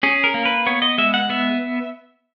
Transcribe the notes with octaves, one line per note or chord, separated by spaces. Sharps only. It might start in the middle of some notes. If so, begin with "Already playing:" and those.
C#4 G#4
A#4
A#3
B4
B3 C#5
D#5
G#3 E5
F#5
B3 E5